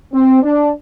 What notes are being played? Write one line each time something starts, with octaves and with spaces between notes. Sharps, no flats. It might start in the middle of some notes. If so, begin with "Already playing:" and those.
C4
D4